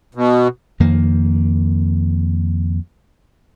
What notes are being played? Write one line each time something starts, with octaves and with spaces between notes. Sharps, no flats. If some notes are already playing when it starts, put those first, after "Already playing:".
B2
F2 D#3 A#3